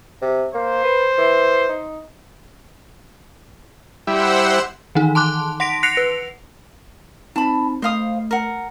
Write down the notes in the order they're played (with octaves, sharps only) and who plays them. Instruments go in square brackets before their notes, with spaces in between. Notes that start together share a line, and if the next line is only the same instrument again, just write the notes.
[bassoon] C3
[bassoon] A#3 [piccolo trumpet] C5
[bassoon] B4
E3
D#4
[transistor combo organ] G3 E4 [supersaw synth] C5 F#5 E6
[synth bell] D#3 E3 D#4
A5 C6 D6 F#6
F#5 C6 A#6 B6 D7
F#6 A#6 C7 C#7 F7
B4
[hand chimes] C4 D#4 [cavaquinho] A5 B5
[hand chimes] A3 [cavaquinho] C5 F5 D#6
[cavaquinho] A#4 F#5